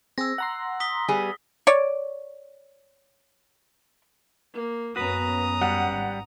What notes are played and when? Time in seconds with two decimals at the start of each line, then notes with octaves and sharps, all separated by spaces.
0.18 C4 G#4 E6 A#6
0.38 F#5 A#5 C6
0.80 D#6 B6 G7
1.08 G3 B3 G#4
1.67 C#5 D5
4.53 A#3
4.96 F#2 B3 C#4 F#4 B4 A#5 D#6
5.61 G3 F#5
5.92 G#1